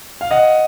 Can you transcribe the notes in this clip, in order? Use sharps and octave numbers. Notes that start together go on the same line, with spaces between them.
F5
D#5 F#5